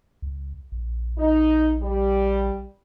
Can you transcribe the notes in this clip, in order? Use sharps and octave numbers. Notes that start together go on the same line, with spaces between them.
C#2
A#1
D#4
G3